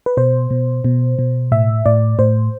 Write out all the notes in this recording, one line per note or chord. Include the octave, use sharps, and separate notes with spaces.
B4
B2 C5
B2
B2
B2
A2 E5
A2 D5
A2 C5